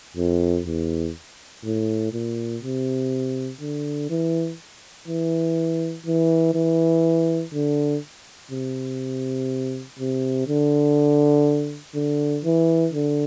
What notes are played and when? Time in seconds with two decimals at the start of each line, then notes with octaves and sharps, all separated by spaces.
0.17 F2
0.66 E2
1.64 A2
2.13 A#2
2.62 C3
3.61 D3
4.09 E3
5.08 E3
6.06 E3
6.54 E3
7.53 D3
8.51 C3
9.99 C3
10.47 D3
11.95 D3
12.44 E3
12.93 D3